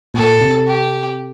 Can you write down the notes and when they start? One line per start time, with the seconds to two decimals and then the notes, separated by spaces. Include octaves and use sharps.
0.14 A#2 A4
0.41 C3
0.67 G4